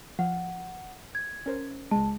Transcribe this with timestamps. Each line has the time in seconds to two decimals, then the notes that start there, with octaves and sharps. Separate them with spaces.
0.19 F3 F5 F#5
1.15 G#6
1.46 C#4 A#4 C5
1.91 C#2 G#3 A5